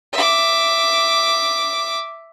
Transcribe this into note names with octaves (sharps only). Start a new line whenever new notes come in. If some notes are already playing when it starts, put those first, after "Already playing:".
E5 D6